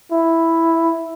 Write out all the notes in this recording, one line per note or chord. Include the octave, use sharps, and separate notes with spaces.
E4